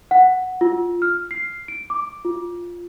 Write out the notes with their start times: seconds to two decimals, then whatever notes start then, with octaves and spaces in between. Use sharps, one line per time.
0.11 F#5
0.61 F4
1.02 F6
1.31 C7
1.68 D7
1.90 D6
2.25 F4